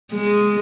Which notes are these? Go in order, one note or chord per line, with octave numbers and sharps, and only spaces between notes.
G#3